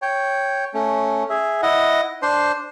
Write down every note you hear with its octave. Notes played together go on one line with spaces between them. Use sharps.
C#5 G5
A3 C#4
G#4 E5
E4 D#5 F#5
D4 C5 C6